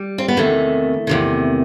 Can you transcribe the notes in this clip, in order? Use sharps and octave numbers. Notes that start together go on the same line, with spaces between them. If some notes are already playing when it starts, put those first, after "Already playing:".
Already playing: G3
C4
B3
E2 C3 D#3 A3
E2 C3 D#3